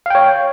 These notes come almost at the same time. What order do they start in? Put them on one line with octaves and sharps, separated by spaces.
F5 G5 C#5